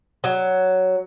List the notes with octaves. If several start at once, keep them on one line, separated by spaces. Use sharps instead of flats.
F#3